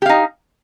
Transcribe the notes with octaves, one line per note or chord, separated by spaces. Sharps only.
D#4 G4 F5